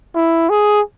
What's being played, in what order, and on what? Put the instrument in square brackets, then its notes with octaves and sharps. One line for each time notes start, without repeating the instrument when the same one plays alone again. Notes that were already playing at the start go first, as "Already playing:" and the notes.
[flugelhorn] E4
G#4